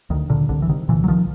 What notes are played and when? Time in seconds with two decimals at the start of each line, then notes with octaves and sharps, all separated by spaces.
0.10 D2 D#3
0.30 A#2 D3
0.49 C2 D3
0.62 E3
0.69 C2 D#3
0.89 A#2 D3 E3
1.04 F#3
1.08 C2 D#3 F3